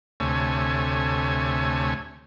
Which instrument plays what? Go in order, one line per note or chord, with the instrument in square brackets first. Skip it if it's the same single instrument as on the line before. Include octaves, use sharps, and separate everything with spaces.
[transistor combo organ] D2 C3 A3 C#5 G#5